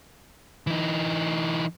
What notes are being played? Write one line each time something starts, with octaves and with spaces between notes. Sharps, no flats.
E3 D#4